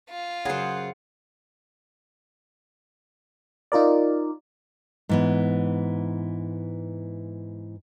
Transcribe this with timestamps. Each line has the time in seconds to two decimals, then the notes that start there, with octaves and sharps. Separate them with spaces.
0.10 F4
0.45 F#2 C#3 G#4 C5 F#5
3.72 D#4 F4 A#4 D5
5.09 G#2 E3 B3